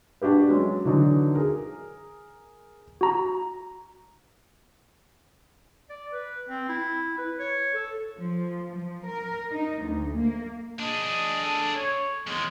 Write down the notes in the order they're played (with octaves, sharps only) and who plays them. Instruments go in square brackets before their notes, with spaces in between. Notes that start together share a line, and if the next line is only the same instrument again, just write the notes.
[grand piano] D4 F#4 G4 B4
F#3 G#3 C#4
D3 E3 F#3 D4 D#4
G#4 A#4
[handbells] F#4 A#5
[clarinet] D5
B4
C4
E4
B4
C#5
A4
[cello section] F3
F3
A#4
D#4
D2
A#3
[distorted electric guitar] D4 G#4 [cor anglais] D#5
[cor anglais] A4
C#5
[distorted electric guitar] E2 D#3 [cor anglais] G#3